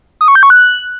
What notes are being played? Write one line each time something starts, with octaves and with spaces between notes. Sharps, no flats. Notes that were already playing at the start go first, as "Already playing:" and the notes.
D#6
C#6
G6
C#6
F#6